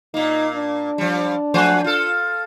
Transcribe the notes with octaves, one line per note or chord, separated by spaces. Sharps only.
A#2 A#3 D#4
D4
F3 G3
F3 A3 C5 F#5 G#5 F#6
F4 A4 F6